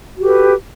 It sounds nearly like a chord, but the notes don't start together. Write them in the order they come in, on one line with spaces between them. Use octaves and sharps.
F#4 G4 A4 B4